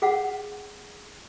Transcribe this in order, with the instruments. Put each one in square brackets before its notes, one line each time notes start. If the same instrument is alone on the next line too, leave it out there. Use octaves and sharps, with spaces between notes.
[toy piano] G#4 F5 F#5